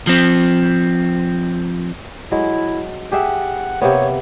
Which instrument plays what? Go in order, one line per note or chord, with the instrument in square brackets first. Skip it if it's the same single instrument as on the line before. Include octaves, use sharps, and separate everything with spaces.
[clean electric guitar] F3 C4
[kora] F#3 G#3 [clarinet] E4
[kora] G4 G#4 E5 [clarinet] F#5
[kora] C3 A#3 B3 [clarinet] C#5